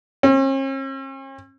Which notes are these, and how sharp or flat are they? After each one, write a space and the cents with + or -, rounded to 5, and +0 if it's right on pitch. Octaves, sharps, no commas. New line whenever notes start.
C#4 -45